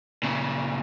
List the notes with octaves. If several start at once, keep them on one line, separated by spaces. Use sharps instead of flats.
A#2 C#3